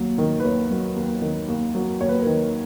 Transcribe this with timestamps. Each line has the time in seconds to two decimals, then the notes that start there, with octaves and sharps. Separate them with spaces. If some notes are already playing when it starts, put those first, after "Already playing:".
Already playing: D#2 F#3
0.18 D#3
0.40 B4
0.44 D#2 C#5
0.71 F#3
0.96 D#2
1.22 D#3
1.48 D#2
1.75 F#3
2.00 D#2 C#5
2.09 B4
2.19 A#4
2.27 D#3 B4